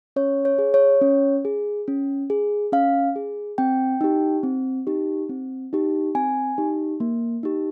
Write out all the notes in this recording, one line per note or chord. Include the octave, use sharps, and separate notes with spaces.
C#4 C#5
C#5
G#4
C#5
C#4
G#4
C#4
G#4
C#4 F5
G#4
C4 G5
D#4 G4
C4
D#4 G4
C4
D#4 G4
C4 G#5
D#4 G4
A#3
D#4 G4